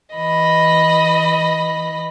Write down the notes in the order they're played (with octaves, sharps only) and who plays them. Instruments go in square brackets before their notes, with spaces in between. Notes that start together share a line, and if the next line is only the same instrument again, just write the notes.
[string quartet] E3 D#5 B5